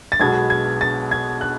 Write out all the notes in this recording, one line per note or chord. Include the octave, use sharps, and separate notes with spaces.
A6
B1 B2 G#3 B3 G#6
G#6
A6
G#6
F#6